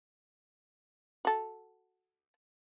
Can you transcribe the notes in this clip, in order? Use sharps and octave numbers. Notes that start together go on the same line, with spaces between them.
F#4 A4